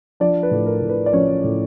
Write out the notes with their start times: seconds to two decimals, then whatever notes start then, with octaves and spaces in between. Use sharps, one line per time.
0.20 F3 D4 D5
0.43 B4
0.51 A2
0.66 A#4
0.82 A2
0.89 B4
1.06 D5
1.13 F3 C#4 C#5
1.44 A2